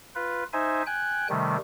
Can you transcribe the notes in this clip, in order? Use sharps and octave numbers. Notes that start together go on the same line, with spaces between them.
F4 B4
D#4 C5 E5 G#5
G5 G#5 F#6
C3 D#3 G3 A3